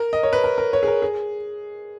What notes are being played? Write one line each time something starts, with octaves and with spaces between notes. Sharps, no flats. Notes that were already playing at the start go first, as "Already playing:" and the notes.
Already playing: A#4
D#5
C#5
B4
A#4
A#4
C#5
G#4
A#4
G#4